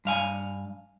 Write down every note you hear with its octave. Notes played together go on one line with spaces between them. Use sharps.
G2 F5 G#5